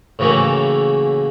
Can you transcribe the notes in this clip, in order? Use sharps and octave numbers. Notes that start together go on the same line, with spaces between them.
A2 C#3 E3 F#3 A3 A#3